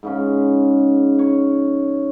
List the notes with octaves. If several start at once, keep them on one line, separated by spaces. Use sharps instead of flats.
G#2 C#3 C#4
C#5